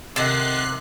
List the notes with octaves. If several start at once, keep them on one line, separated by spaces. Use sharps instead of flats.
C3 D#3 A4 F#5 F#6 C7